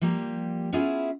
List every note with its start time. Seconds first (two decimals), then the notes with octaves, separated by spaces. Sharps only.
0.01 F3 G3 A#3 G4
0.72 B3 C#4 E4 F4 G#4 E5